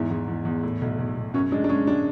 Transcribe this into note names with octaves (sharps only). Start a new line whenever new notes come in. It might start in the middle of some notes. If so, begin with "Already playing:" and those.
Already playing: E2 G#2 E4
E2
E2
E2
A2
B1
B1
B1
F#2 C#4
G#3 D4
D4
G#3 C#4
D4